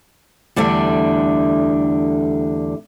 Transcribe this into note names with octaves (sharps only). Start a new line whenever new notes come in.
E2 D3 G3 A3 E5